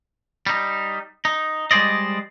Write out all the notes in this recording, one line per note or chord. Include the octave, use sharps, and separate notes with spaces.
G3 D#4
D#4
G3 G#3 G#4 C5 D5 D#5